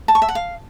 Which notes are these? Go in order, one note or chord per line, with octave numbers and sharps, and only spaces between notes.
A5
C#6
E5
F#5
F5